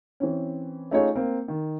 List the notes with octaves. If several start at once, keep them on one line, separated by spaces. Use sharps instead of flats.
E3 C4 C#4
A3 C#4 D#4 F4 G#4 C#5
A#3 C4
D#3